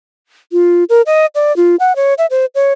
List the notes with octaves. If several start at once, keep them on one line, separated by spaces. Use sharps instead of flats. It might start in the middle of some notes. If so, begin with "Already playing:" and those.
F4
A#4
D#5
D5
F4
F#5
C#5
E5
C5
C#5